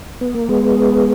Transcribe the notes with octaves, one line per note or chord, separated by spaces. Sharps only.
B3
A#3
G#3 B3